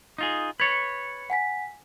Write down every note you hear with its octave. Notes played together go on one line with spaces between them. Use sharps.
D#4 F4 G#4
B4 C#5 G#6 A6 C#7
F#5 G#5 B6